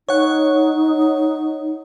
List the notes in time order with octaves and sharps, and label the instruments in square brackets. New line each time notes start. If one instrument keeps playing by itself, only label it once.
[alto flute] D#4 [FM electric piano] C#5 F#5